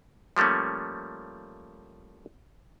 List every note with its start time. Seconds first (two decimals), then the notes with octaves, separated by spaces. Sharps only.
0.37 F3 G3 A3 A#3 C#4